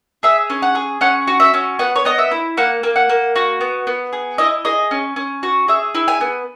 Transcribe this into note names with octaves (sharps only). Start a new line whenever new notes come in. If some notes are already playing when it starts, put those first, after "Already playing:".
G#4 E5
C#4
F#5
G#4
C#4 F#5
F#4
E5
C#4
B3 F#5
C#5
B3 D#5
E5
E4
A#3 F#5
A#3
F#5
A#3
F#4
B3
B3
G#4
E4 D#5
G#4 D#5
C#4
C#4
F#4
G#4 E5
E4
G#5
B3